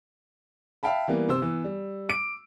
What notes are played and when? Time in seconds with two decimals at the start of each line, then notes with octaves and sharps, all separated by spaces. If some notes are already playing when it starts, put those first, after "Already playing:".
0.83 E5 F5 G5 A5 B5
1.08 E3 G3 A#3 B3
1.29 C3 C5 E6
1.42 E3 B3
1.64 G3
2.09 D6 D7